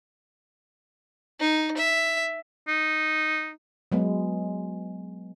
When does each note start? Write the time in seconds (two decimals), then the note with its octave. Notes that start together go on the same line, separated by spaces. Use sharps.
1.40 D#4
1.77 E5
2.68 D#4
3.92 F#3 G#3 B3